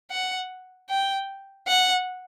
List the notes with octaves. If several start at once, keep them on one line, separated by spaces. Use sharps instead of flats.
F#5
G5
F#5